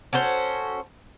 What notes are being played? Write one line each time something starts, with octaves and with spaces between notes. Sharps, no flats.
C#4 F#4 A4 C5